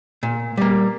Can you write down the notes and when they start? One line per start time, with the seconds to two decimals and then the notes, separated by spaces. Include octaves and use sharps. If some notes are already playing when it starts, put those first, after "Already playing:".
0.23 A#2
0.57 G3 A#3